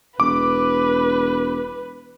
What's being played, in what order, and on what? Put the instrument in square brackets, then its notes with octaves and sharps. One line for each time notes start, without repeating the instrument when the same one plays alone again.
[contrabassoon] E1 [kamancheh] B4 [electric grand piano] D6